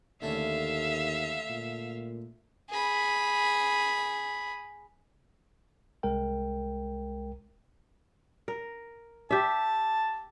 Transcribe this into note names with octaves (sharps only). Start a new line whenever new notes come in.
D#2 D3 A3 C#4 E5 F5
A#2
G#4 B5
C2 G#3 A#4 G5
A#4
G4 E5 A5